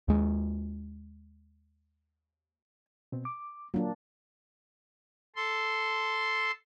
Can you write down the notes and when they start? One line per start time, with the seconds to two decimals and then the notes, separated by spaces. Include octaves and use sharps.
0.08 D#2 G#3
3.12 B2 C4
3.25 D6
3.74 F#3 A#3 D4 F4
5.36 A4 C6